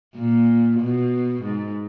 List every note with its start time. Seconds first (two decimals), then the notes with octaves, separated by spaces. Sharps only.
0.16 A#2
0.80 B2
1.43 G#2